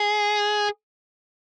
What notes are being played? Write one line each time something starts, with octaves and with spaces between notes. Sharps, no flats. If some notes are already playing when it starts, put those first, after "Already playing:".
Already playing: G#4